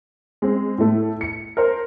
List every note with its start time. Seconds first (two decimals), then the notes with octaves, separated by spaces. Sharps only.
0.42 G#3 C4
0.78 A2 A3
1.21 C#7
1.57 A#4 C5